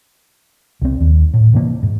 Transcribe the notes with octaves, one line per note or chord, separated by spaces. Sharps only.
C2 C4
D#2
A2
C3 E3 A#3
G#2